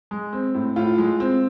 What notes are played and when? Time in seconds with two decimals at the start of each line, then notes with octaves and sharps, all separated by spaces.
0.11 G#3
0.33 C4
0.54 A2
0.76 A2 F4
0.98 G#3
1.20 C4